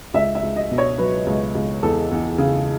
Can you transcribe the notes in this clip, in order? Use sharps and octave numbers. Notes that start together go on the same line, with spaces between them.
C#2 E5
E5
C#2
D#5
B2
C#5
F#3 B4
C#2
C#2
E2 A4
E2
C#3